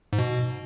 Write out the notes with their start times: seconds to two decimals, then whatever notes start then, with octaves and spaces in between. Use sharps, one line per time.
0.13 G#2
0.19 B2